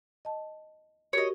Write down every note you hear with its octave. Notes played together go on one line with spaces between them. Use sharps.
D#5 A5
F#4 G4 A#4 C#5 D#5